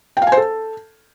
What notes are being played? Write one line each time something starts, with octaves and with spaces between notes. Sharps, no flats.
G5
F5
G#5
C5
A4